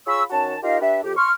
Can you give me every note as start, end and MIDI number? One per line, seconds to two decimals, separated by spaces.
0.07 0.23 65
0.07 0.23 68
0.07 0.23 73
0.07 0.23 83
0.07 0.23 85
0.07 0.23 88
0.30 0.56 51
0.30 0.56 61
0.30 0.56 66
0.30 0.56 81
0.63 0.80 63
0.63 0.80 65
0.63 0.80 67
0.63 0.80 70
0.63 0.80 75
0.63 0.80 77
0.81 1.01 62
0.81 1.01 67
0.81 1.01 71
0.81 1.01 76
1.04 1.14 41
1.04 1.14 67
1.17 1.32 84
1.17 1.32 85
1.17 1.32 89